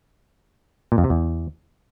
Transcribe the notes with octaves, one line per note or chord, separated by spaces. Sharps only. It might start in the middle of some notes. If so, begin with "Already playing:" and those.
A#2
F2
C3
E2